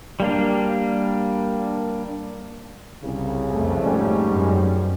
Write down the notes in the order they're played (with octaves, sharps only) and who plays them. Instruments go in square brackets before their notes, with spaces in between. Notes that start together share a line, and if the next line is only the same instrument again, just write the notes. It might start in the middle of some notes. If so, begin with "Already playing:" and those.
[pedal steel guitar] G3 A#3 D4
[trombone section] C2 C#3
[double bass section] F2 A3
[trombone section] G#2 G3 C#4
[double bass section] F#2